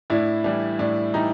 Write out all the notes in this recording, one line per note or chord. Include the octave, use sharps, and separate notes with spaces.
A2 D4 E4
E3 G3 D4
A2 D4
E3 G3 D#4